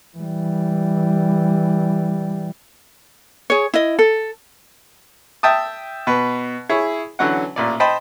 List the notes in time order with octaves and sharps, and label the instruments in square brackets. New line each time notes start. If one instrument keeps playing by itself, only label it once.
[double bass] E3 G3
[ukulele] G#4 C#5
E4 D#5
A4
[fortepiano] E5 G5 A5 D#6
B2 B4
E4 G#4 C#5
D3 E3 F#3 C#4 F#5
A1 A#2 D5
C5 D#5 G5 A5 B5